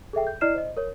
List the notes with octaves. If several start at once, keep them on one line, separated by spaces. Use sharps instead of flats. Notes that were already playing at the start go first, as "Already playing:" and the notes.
G#4 A4 E5 G5
G6
E4 D5 D#5 F6 C7 E7
C5 D#5
A#4 C#5